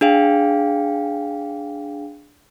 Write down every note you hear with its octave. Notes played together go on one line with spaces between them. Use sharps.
D4 G#4 F5 G5